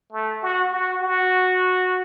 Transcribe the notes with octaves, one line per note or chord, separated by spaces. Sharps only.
A3
F#4
F#4
F#4